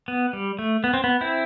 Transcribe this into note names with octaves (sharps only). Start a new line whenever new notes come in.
B3
G3
A3
B3
C4
B3
C4 E4